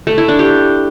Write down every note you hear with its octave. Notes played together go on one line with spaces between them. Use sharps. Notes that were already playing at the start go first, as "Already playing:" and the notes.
A3
E4
D4
G4